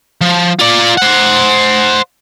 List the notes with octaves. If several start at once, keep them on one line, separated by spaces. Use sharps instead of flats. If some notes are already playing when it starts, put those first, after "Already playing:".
F3
F4 D5
C5 F#5